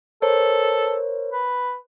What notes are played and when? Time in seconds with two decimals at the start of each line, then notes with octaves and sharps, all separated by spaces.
0.22 A4 A#4 C5 C#5
1.31 B4